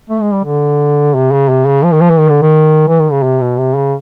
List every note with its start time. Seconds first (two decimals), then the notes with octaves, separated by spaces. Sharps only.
0.10 A3
0.21 G#3
0.33 G3
0.45 D3
1.15 C3
1.32 C#3
1.49 C3
1.67 C#3
1.84 F3
1.93 D#3
2.01 F3
2.10 E3
2.19 D#3
2.30 D3
2.42 D#3
2.88 E3
3.00 D#3
3.12 C#3
3.23 C3
3.41 B2
3.58 C3
3.76 C#3